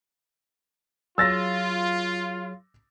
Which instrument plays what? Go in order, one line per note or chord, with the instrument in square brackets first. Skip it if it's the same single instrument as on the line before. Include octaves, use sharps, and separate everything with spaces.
[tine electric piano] F#3 G#4 C#5 [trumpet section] F4 [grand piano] E6 A6 A#6